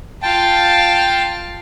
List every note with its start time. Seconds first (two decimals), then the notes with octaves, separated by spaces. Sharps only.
0.22 F4 F5 G5 A5